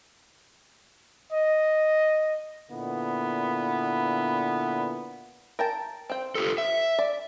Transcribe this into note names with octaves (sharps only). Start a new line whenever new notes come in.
D#5
A#2 D3 B3 E4
A#4 G5 A5
C4 G5
F4 G4 A4
E5
D5